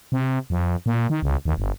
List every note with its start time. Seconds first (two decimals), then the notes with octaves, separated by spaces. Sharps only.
0.12 C3
0.50 F2
0.86 A#2
1.10 D#3
1.22 C#2
1.45 D#2
1.58 G1